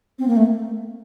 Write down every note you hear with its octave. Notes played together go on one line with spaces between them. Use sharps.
C4
A#3
A3